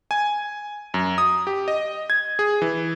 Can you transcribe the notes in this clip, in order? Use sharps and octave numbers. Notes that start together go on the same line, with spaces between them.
G#5
F#2
D#6
G4
D#5
G#6
G#4
E3